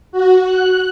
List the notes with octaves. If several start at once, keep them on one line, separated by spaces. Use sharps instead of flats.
F#4
F#6